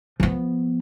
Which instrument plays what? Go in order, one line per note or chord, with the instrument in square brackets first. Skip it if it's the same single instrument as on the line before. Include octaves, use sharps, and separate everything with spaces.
[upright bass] F3 B3